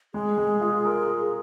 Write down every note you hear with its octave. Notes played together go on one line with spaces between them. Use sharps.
G#3 G#4
G#3
F4
A#4